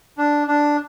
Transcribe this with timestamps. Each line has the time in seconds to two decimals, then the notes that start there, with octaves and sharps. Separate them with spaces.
0.18 D4
0.47 D4